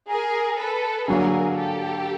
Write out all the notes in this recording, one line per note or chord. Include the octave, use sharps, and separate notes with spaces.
G#4 A#4
A4 B4
D3 F#3 A#3 G#4 A#4
G4 A4